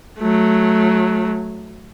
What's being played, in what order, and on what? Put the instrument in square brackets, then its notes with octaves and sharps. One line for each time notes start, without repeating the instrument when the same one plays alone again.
[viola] F#3 A3